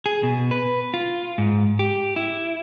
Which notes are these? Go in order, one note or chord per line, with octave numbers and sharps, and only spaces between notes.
G#4
B2
B4
F4
G#2
G4
E4